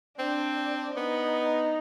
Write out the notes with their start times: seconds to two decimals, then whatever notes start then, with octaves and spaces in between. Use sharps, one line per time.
0.19 C4 D4
0.96 B3 D#4